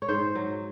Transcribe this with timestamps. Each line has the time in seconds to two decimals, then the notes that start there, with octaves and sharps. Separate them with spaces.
0.02 C#5
0.08 G#2 C5
0.35 F#3